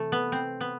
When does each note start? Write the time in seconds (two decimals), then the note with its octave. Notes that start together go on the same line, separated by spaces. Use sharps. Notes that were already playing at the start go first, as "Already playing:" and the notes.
Already playing: C3 E3 A3
0.12 B3
0.32 C4
0.60 B3